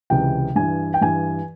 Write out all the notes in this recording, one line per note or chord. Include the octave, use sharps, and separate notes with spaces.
C#2 C3 E3 G5
G2 E3 G#5
G5
G2 E3 G#5